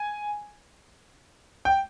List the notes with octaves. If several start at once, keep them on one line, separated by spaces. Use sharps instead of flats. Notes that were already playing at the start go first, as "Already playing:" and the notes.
Already playing: G#5
G5